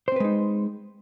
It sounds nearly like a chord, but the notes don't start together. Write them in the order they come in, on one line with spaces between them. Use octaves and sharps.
C5 C4 B4 G#3 D#4